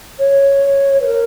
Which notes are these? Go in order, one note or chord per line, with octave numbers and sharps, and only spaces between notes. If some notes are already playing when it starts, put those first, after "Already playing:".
C#5
B4
A#4